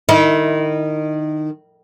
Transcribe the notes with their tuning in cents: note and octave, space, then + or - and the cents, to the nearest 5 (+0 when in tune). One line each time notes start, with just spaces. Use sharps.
D#3 -20 E4 -30